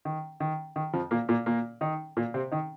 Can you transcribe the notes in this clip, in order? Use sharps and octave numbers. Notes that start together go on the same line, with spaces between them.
D#3
D#3
D#3
F2 F3
A#2 A#3
A#2 A#3
A#2 A#3
D#3 D#4
A#2 A#3
C3 C4
D#3 D#4